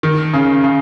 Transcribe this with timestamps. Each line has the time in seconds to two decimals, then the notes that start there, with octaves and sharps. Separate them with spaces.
0.03 D#3
0.34 C#3
0.64 C#3